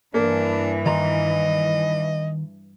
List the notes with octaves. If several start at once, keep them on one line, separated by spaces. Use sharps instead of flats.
G2 E3 A#3 D4
D#3 D#5 A#5 C6